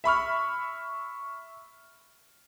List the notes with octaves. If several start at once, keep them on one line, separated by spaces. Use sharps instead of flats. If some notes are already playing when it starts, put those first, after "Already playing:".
E5 B5 C#6 F6